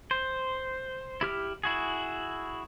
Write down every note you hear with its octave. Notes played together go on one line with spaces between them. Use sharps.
C5
E4 G4 F6
E4 F#4 G#4